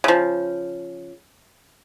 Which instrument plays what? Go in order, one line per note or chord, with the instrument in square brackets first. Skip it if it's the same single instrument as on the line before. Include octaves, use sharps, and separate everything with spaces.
[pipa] C#3 F3